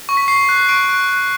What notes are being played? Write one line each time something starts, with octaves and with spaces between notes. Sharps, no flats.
C#6
B6
C#6 C7
F#6
C#6 D7
F#6
F#6